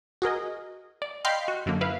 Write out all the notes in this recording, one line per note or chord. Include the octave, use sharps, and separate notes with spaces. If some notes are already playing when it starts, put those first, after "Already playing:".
F#4 G#4 A#4 D#5
D5
D#5 F5 G5 B5 C6 G6
F#4
F#2 D3 F#3 A#3
E4 B4 F5